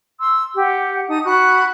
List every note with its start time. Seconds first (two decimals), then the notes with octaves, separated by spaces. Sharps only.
0.20 C6 E6
0.56 G4 F#5
1.09 D#4 A5 D#6
1.24 F#4 B5 F#6